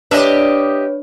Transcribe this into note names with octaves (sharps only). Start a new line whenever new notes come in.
D4 G4 B4 C#5 D#5 E5